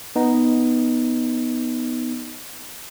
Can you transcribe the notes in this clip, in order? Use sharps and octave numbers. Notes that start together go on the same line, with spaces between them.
B3 D#4